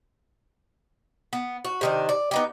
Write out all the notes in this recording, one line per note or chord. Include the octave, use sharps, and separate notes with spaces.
B3
F#4
C3 D#3 D4
D5
B3 D#4 G4